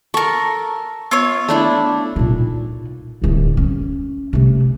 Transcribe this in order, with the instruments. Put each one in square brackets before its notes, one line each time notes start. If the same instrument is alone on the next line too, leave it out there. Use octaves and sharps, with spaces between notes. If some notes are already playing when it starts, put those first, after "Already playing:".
[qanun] A4 [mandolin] A#4 C#6
[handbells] B3 E6 [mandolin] F4 C#5
[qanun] A3 D4 E4
[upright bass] A#2 D#4
D1 G1
C#4
C3 A3